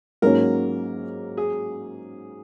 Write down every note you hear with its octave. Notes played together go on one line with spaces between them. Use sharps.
G#2 F#3 A#3 C#4 F#4 A#4
G#4